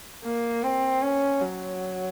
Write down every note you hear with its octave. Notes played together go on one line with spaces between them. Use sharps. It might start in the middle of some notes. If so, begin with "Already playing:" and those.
A#3
C4
C#4
F#3